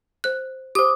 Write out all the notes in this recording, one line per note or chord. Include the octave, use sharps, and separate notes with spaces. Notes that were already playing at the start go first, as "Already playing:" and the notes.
C5 F#6
G4 C5 D6 D#6